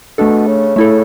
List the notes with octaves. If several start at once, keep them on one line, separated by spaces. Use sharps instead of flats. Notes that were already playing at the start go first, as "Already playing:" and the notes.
B2 A3 D4 A4
C#3
C#3 A3 E4 A4